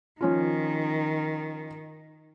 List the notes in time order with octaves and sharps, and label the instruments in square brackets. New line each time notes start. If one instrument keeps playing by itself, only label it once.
[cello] D#3 [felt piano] F3 C#4 F4